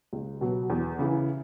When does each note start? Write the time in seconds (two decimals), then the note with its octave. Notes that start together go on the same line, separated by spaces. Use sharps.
0.13 C#2
0.41 B2 F#3
0.70 E2
0.99 C#3 E3